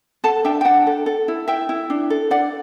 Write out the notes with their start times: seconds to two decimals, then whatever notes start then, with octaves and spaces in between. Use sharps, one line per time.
0.24 A4 F#5 A5
0.44 D4 E5 G5
0.61 G5
0.65 D4 F#5 A5
0.87 A4
1.06 A4
1.28 E4
1.48 E4 E5 G5
1.69 E4
1.90 D4
2.10 A4
2.31 D4 D5 F#5